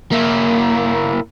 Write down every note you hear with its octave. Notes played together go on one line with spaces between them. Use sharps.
A#3 E4